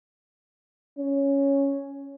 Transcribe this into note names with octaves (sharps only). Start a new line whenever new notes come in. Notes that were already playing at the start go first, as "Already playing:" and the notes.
C#4